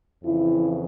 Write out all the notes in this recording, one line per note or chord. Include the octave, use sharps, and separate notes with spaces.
F2 C#3 E3 E4